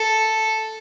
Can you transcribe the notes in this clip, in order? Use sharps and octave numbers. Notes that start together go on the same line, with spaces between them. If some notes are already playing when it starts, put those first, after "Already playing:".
Already playing: A4